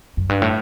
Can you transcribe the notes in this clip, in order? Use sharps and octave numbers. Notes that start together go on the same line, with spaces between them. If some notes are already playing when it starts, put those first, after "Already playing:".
F#2
G2
A2